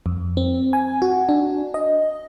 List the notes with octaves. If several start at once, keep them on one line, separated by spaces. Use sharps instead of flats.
F2
C4
G#5
F#4
D4
D#5